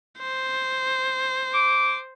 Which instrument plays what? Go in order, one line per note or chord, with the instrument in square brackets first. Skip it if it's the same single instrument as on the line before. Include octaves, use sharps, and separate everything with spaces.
[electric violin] C5
[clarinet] D6